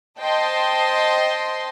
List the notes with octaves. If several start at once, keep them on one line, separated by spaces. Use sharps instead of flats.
C5 D#5 G5 A5 C6